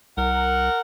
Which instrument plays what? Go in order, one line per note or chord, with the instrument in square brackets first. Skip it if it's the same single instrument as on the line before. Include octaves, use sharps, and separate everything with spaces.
[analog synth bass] C2 [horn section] A#4 F#5